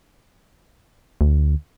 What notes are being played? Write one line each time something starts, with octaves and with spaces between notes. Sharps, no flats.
D2